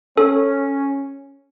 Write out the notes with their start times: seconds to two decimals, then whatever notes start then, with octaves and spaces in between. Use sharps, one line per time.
0.17 C#4 A4